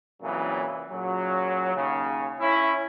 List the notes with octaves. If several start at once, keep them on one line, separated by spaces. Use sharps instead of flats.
C2 A#2 C#3 E3 F#3
A#2 C#3 F#3
D#2 C#3
C#4 E4